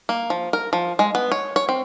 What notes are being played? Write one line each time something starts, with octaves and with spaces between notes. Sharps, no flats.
A#3
F3
A#4
F3
G#3
B3
C#5
C#5
C4